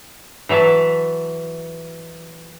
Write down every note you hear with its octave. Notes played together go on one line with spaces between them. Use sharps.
E3 F#3 E5 A5